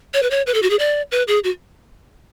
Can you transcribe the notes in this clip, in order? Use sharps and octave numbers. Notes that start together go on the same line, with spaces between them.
C#5
B4
C#5
B4
A4
F#4
G#4
D5
B4
G#4
F#4